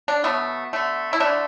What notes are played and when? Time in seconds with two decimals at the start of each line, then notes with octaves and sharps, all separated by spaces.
0.08 D4
0.24 B2 F#3 A3 B3
0.73 D3 A3
1.13 E4
1.20 D3 A3 D4